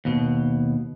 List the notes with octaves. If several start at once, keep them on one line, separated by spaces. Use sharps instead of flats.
D#2 B2